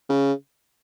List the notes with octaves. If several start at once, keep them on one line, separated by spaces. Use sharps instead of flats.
C#3